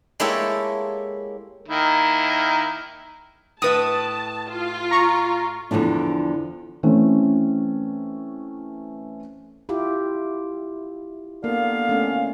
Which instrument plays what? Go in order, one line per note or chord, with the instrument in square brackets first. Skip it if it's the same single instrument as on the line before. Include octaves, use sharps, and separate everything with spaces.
[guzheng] G#3 A#3 E4 G4 A4 C#5
[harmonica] D#3 A#3 E4
[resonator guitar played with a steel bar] A2 B4 E5 [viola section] A5 [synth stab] D#6
[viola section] F4
[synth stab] A#5 C#6
[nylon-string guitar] E2 D3 D#3 F3 D4
[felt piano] E3 A3 C4 C#4
[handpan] E4 F4 G4
[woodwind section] D3 B3 F5 [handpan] A#3
[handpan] A3 C#4